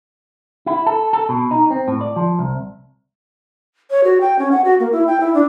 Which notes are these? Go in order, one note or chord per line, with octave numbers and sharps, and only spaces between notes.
E4
A4
A4
B2
D#4
C4
A2
D5
F3
C2
C#5
F#4
G5
C#4
F#5
F#4
A#3
E4
G5
E4
D4